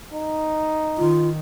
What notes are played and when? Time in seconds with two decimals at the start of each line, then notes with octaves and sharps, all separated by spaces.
0.14 D#4
0.98 D#3 F4